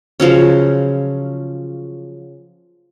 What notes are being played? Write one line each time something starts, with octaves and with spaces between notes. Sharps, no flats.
C#3 F3 F#3 C#4